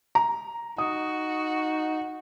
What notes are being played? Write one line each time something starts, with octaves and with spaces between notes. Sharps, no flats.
A#5
D#4 F#4 D#6